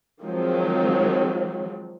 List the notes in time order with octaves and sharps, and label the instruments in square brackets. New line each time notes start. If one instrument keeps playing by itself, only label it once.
[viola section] D#3 F3 F#3 G#3 C4